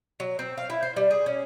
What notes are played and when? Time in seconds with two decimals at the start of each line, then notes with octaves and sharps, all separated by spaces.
0.20 F#3
0.39 C4
0.58 F5
0.70 E4
0.83 C5
0.96 G3
1.11 G#4
1.26 C#4